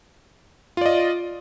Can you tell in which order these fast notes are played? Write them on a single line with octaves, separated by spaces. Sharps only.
F4 D5 D#5